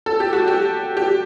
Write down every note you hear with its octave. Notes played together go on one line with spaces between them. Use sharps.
A4
G4
F#4
G4
G4